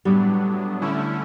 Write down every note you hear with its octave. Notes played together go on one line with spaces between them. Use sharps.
A2 F#3 G3 B3 D4
D3 A3 C#4 E4